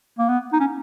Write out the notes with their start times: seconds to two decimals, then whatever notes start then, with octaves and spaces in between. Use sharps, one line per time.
0.19 A#3
0.29 B3
0.53 D#4
0.60 C#4